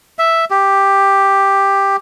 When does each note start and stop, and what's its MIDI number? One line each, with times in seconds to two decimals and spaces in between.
0.19 0.45 76
0.50 1.96 67